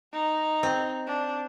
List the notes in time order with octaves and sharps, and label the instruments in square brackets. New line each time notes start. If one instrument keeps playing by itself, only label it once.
[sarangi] D#4
[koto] C4
[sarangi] D4